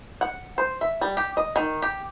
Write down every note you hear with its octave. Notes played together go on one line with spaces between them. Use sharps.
F#5
C5
E5
G3
G4
D#5
D#3
G4